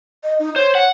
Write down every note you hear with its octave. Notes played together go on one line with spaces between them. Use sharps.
D#5
D#4
C5 C#5
F#5